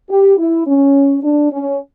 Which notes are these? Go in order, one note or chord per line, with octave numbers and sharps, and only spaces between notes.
G4
E4
C#4
D4
C#4